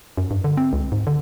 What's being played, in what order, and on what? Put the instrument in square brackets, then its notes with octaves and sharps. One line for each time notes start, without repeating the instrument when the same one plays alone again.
[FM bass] F#2
G2
D3
C4
C#2
G#2
D3